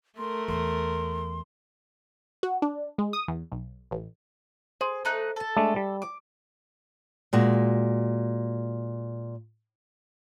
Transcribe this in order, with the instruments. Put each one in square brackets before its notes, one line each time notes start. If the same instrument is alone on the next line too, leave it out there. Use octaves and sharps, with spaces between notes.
[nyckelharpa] A3 A#4 [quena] C6
[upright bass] E2 [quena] C6
[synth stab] F#4
D4
G#3
D#6
E2
B1
A1
[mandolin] G#4 [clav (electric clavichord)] C5
[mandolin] A3 D#4 F#6
A4 A5
[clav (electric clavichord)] G#3 A3 D4
G3
[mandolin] D6
[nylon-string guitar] A#2 G#3 F#4